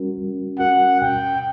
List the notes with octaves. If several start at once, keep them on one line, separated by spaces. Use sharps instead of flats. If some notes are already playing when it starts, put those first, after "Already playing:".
Already playing: G3 C#4 F#4 A#4
G3
C#4 F#4 A#4 F#5
B2 G5